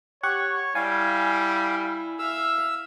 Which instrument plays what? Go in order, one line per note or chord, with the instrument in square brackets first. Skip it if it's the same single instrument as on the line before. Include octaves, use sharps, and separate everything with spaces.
[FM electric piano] G4 F#5 C#6 [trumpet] C#5
[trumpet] G3 [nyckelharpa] E4 [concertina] F5 [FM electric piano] G#5
[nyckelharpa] E5 F5 [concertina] E6